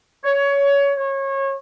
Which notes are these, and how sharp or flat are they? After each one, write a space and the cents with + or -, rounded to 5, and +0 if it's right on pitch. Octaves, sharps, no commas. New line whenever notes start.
C#5 +20
C#5 -25